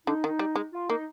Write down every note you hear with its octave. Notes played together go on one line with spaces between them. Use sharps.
D3 D#4
D#3
G3
G#3
F4
A#3 D#4